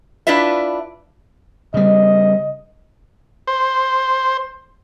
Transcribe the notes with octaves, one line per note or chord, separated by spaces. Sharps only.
D4 E4 F4 B4 E5
C#3 G3 D#5
C5